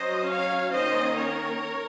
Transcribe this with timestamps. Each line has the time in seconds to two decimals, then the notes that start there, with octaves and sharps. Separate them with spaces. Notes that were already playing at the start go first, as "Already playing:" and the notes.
Already playing: F#3 C#4 C5 D#5
0.30 C#5 F5
0.72 D#3 A#3 C#4 C5 D#5
1.16 A#4 C#5